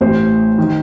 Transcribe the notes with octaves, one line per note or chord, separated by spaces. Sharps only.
A1 A2 C5
D#3